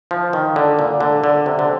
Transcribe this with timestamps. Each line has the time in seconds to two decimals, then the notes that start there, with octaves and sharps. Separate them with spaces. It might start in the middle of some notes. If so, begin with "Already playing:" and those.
0.11 F3
0.33 D#3
0.56 D3
0.79 A#2
1.00 D3
1.24 D3
1.46 C3
1.59 D3